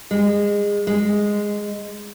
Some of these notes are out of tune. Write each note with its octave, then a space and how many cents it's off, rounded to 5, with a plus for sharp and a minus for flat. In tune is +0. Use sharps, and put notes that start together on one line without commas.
G#3 -25
G#3 -10